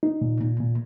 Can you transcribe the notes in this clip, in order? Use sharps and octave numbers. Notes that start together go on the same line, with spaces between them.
D#4
A#2
A#2
A#2